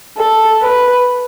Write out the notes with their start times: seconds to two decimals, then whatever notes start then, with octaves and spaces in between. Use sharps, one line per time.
0.17 A4
0.61 B4